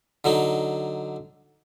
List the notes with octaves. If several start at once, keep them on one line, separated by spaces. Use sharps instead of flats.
D3 F#3 D#4